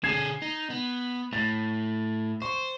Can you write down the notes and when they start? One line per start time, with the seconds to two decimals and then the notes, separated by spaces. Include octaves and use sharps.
0.04 D3 G#4 G#6 C7 E7
0.42 D#4
0.70 B3
1.33 A2 A6
2.42 C5 C#6